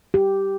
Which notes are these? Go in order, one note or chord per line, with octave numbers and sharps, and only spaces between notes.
G4